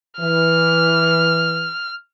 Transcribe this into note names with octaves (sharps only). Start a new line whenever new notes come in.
E3 F6